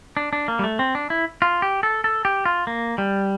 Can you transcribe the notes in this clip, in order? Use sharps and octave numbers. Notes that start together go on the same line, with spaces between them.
D4
D4
A#3
G3
A3
C4
D4
E4
F4
G4
A4
A4
G4
F4
A#3
G3